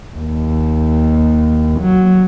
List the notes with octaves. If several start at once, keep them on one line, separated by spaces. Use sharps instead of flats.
D#2
F#3